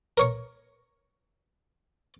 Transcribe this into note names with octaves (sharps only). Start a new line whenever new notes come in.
A#4 C#5 C#6